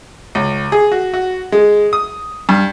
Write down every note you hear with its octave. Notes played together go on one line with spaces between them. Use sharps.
C#2
G#4
F#4
F#4
G#3
D#6
G2